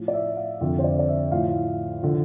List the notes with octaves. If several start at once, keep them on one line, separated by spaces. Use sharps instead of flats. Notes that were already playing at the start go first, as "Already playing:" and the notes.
Already playing: A2 F3
D5
E5
F5
F2 D3 F3 E5
C5
D5
D5
E5
A2 F3 F5
D3 F3